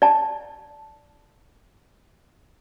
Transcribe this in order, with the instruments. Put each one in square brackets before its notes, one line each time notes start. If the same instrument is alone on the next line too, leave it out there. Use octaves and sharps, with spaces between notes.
[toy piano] D5 A5